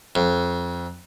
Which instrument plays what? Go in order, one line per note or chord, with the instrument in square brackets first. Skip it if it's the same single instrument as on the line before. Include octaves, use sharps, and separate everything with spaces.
[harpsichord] F2